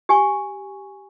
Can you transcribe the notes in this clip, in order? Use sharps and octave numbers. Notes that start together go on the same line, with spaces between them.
G4 G#5 C#6